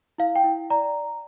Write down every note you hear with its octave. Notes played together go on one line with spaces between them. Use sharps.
E4 F5
G5
E4
D5 A#5